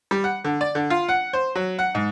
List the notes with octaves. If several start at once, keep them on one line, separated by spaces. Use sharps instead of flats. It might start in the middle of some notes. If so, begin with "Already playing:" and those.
G3
F#5
D3
D5
D3
F4
F#5
C5
F#3
F#5
G#2